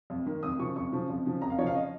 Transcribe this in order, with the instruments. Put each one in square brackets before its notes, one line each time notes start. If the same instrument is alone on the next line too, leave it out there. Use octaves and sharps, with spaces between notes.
[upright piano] F2
D#3
F2 D#6
C#3 F3 C#6
F2 C#6
C#3 F3
F2
C#3 F3
F2 A#5
F5
F3 C#5
C#3 F5
D#5